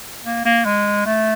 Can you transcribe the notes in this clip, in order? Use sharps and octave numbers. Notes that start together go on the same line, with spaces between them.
A#3
A#3
G#3
A3